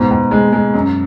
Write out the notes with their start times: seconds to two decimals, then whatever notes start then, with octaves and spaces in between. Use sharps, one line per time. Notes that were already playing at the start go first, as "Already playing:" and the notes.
Already playing: G#2 B2
0.11 G#2
0.31 G#3
0.53 G#3
0.74 F#2